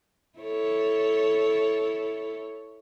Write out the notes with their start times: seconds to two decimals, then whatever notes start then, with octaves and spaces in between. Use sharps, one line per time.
0.39 E4 A4 C#5